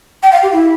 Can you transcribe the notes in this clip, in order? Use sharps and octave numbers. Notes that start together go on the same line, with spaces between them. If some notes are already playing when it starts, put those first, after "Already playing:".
G5
F5
G4
E4